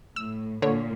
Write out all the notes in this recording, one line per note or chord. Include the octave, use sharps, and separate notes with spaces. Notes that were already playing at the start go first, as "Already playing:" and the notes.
A2 E6
A#2 D3 C#5